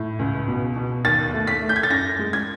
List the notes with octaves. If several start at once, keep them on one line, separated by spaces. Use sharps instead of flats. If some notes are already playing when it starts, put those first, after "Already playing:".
Already playing: A2
C#2
B2
B2
D#2 A6
A3
B6
A3
G6
G#6
A6
F#2 A#6
G#3
G#6